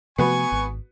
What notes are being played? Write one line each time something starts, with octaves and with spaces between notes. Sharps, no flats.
C3 F3 A3 B3 F#4 B4 G#5 C#6
G#1